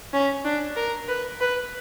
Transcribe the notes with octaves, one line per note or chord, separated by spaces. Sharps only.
C#4
D4
A#4
B4
B4